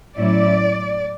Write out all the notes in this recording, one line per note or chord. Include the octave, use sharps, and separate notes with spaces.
A2 F#3 C#4 E4 D5